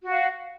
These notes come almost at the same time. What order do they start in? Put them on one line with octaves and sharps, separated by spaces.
F#4 F#5 F5